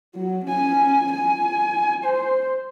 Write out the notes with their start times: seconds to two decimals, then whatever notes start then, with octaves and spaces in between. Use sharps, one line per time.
0.15 F#3
0.45 C#4 G#5
1.12 G#5
2.05 C5